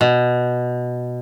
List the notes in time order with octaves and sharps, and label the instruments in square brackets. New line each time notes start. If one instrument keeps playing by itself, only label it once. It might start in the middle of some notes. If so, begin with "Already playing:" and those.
[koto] B2